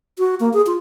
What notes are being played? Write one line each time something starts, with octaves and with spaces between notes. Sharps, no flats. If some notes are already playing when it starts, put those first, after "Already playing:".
F#4
A#3
G#4
F4